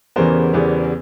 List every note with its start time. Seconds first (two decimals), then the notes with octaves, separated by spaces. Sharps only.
0.16 E2 C#3 E3 G3 B3 A#4 C5
0.53 E2 C#3 E3 G3 B3